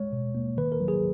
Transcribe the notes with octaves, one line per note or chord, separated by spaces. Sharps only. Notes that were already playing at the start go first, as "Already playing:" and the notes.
Already playing: G#3 C#5
B2
A#3
D#3 B4
A#4
F#3
G#4